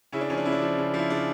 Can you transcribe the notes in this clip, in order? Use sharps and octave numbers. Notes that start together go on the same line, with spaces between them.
C#3 C#4 E4
D4
F3 C#4
D4
C#3 E4
D4
F3
C#3
F3 E4
C#3 D4